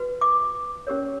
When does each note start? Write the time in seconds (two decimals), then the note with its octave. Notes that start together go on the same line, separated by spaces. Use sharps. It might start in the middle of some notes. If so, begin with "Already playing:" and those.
Already playing: F#4 B4
0.21 D6
0.87 C#4 G4 A#4 C#5